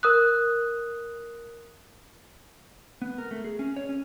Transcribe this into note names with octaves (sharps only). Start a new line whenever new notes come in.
A#4 D#6 F#6
B3
A#4
A3
G#4
C#4
C#5
C#4